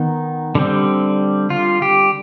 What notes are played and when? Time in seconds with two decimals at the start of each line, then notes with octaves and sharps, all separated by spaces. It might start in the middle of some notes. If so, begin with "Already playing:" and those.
Already playing: D#3 B3 D#4
0.55 D3 G3 C4
1.50 F4
1.82 G4